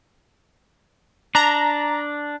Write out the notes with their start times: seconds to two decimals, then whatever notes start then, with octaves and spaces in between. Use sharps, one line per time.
1.35 D4 A#5